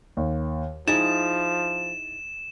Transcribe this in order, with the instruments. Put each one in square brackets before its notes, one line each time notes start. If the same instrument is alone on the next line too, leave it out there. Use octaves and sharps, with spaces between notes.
[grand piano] D#2
[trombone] F3 [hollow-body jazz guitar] D#4 E4 G#4 [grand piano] A6 [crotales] E7